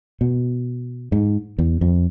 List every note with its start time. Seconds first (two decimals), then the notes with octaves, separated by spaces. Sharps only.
0.21 B2
1.12 G#2
1.58 E2
1.81 F2